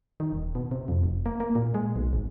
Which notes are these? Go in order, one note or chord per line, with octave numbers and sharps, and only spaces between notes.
D#3
D#1
B2
C3
F2
F1
A#3
A#3
A#2
G#3
B1
G#1